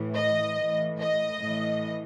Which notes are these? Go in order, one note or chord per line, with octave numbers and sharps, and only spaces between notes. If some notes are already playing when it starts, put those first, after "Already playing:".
Already playing: A2 E3
D#5
A2 E3
D#5
A2 E3